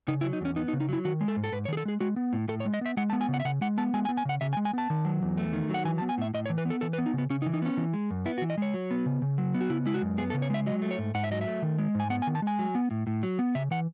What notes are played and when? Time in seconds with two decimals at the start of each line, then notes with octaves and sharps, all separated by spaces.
0.08 C#3 D#4
0.21 E4
0.24 F#3
0.33 D#4
0.41 E2 C#4
0.56 B3 D#4
0.68 D#4
0.73 C#3
0.80 D#4
0.89 F#3 E4
1.05 D#3 F#4
1.21 G#3
1.28 A4
1.37 G#2
1.44 A4
1.52 G#2 B4
1.65 C#5
1.68 D#3 G#4
1.77 A4
1.85 G#3 G#4
2.00 G#3 F#4
2.16 B3
2.33 A2
2.48 A2 A4
2.60 C#5
2.65 G#3
2.74 D#5
2.81 B3 E5
2.97 G#3 F#5
3.10 A5
3.13 B3
3.21 G#5
3.29 C#3
3.34 F#5
3.40 E5
3.45 C#3 F#5
3.61 G#3 F#5
3.78 B3 A5
3.94 G#3 G#5
4.05 G#5
4.09 B3
4.17 G#5
4.25 C#3 F#5
4.41 C#3 E5
4.53 G#5
4.57 G#3
4.65 G#5
4.73 B3 A5
4.90 D#3
5.05 F#3
5.22 E2
5.37 A3
5.53 D#3
5.69 F#3 F#5
5.85 E3 G#5
5.98 A5
6.02 B3
6.09 G#5
6.18 A2 E5
6.34 A2 D#5
6.46 C#5
6.50 E3
6.58 B4
6.65 B3 A4
6.81 E3 A4
6.93 B4
6.98 B3
7.06 D#4
7.13 C#3 B3
7.30 C#3 C#4
7.42 D#4
7.46 E3
7.54 D#4
7.62 B3 C#4
7.77 E3
7.93 G#3
8.11 F#2
8.26 B3 E4
8.38 F#4
8.42 E3
8.50 D#5
8.58 G#3 C#5
8.74 F#3
8.91 B3
9.06 C#3
9.22 C#3
9.38 F#3
9.54 B3
9.61 F#4
9.70 C#3 E4
9.86 G#3 E4
9.94 F#4
10.02 F#2
10.18 B3 G#4
10.30 A4
10.34 C#3
10.42 C#5
10.50 G#3 E5
10.66 F#3 D#5
10.82 A3
10.91 C#5
10.98 G#2
11.14 G#2 F#5
11.24 E5
11.31 F#3 D#5
11.41 E5
11.47 A3
11.62 D#3
11.78 G#3
11.95 G#2
12.00 G#5
12.10 B3 F#5
12.22 G#5
12.27 D#3
12.35 A5
12.42 G#3 G#5
12.59 F#3
12.75 B3
12.91 A2
13.07 A2
13.23 F#3
13.39 B3
13.55 C#3 E5
13.71 E3 F#5